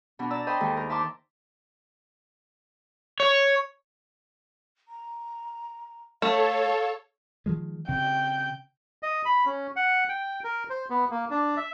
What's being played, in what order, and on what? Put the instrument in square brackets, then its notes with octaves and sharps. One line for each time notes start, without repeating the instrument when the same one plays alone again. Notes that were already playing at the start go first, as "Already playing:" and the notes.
[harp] B2 B3 D4
D5 A5 A#5 E6
C5 D#5 G5 B5 C6
D#2 D#3 G#3 A4
A#4
E5 A5 A#5 C6 D6
[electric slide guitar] C#5
[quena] A#5
[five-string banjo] A3 [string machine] A4 C#5 [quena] F5
[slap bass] D#3 F3 G#3
[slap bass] C#3 C4 [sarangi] G5
[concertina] D#5
B5
C#4
F#5
G5
A#4
C5
B3
A#3
D4
E5